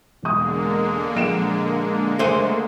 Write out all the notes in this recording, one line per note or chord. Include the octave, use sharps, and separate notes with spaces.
E1 D3 G#3 A#3 D#6
A#1 D7 E7
A3 C5 E5 D#7